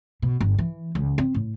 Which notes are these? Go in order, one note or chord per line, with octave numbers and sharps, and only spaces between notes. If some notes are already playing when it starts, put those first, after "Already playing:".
B2
G1
E3
C#2
C4
A2